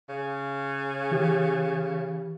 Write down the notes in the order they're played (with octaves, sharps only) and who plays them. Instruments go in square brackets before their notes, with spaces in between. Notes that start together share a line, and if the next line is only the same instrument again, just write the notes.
[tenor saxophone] C#3
[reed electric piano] E3 G4